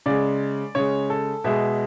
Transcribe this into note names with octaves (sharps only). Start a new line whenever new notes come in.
C#3 G#3 D5
C#3 G#3 C#5
A4
B2 G#3 E5